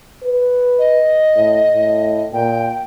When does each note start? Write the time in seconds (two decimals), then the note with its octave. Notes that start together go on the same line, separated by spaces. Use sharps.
0.24 B4
0.79 D#5
1.35 A2
1.74 A2
2.33 A#2 G5